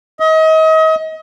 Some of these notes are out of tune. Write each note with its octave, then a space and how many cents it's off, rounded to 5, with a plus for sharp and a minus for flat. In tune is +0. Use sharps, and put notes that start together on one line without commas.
D#5 +35